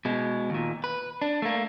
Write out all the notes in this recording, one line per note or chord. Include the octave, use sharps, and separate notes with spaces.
B2 G#3
D#2 A#2
B4
D4
A3 A#3